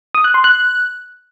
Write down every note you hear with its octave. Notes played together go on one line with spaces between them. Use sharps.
D#6
F#6
C6
F#6